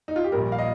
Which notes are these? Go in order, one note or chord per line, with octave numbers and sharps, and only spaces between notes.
D#4
F4
G4
A#1 A#2 G3 A#4
F5
D#5